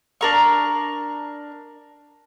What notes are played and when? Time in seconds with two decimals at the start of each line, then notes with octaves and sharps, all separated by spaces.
0.21 D4 A#4 C#6